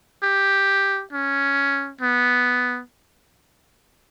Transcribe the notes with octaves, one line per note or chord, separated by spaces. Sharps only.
G4
C#4
B3